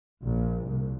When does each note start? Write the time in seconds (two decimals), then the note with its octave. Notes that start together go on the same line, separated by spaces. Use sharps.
0.22 A#1
0.66 C2